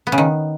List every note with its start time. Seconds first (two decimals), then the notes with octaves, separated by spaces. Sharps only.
0.07 B3
0.12 C#3
0.18 D#3